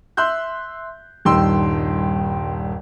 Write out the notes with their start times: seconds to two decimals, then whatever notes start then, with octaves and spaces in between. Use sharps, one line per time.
0.17 E5 C6 E6 F#6 G6
1.25 D#1 G2 D#3 G5 C6 E6